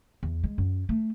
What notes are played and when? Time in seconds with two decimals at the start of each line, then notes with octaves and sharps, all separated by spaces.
0.23 E2
0.44 G#3
0.58 F#2
0.89 A3